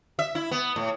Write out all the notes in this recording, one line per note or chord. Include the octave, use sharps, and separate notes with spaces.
E5
E4
B3
A2